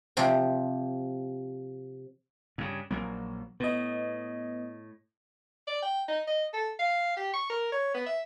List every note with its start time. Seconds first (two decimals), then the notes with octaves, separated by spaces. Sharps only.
0.17 C3 F3 G4
2.58 G2 C#3
2.91 A#1 F#3 A#3
3.60 A2 B3 D#5
5.67 D5
5.82 G5
6.08 D#4
6.27 D#5
6.54 A4
6.79 F5
7.17 G4
7.34 C#6
7.50 A#4
7.72 C#5
7.94 B3
8.06 E5